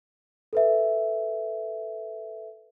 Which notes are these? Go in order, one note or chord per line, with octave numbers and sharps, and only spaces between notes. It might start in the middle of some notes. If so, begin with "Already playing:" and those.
A4 B4 E5